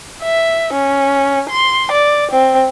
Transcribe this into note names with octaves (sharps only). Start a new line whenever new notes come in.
E5
C#4
C6
D5
C4